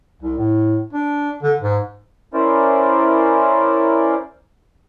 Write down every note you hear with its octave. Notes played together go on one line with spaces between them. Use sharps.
C2
A2
D4
D3
G#2
C#4 E4 A#4 C5 D5